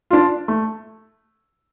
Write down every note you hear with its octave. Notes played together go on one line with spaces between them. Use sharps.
D4 F4
A3